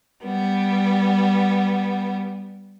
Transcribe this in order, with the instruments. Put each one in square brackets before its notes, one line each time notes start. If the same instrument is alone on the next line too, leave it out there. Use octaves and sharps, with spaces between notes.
[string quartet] G3 B3